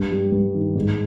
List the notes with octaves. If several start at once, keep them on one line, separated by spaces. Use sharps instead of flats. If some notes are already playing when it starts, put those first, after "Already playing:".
Already playing: G2 G3
G3
G2
D#3
G#2